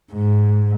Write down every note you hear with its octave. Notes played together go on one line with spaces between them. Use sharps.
G#2